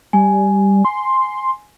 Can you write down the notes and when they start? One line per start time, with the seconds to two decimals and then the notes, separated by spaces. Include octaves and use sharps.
0.13 G3 G#5
0.85 C6